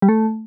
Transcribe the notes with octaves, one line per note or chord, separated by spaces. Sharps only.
G3
A3